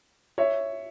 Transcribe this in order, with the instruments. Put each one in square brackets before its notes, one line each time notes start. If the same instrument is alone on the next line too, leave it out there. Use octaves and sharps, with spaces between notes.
[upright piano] C#5 E5